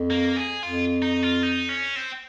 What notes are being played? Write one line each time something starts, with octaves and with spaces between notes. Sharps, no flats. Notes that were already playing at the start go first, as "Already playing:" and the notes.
Already playing: F2
A#3
G#4
F2 F4
D#4
F4
D#4
C#4
C4